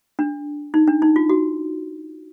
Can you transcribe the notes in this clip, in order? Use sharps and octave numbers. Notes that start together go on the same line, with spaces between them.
D4
D#4
D4
D#4
F4
F#4